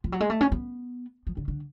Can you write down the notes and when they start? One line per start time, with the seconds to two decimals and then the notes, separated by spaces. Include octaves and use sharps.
0.04 F3
0.12 F#3
0.20 G#3
0.30 A3
0.41 C#4
0.52 B3
1.27 F3
1.37 D3
1.48 D3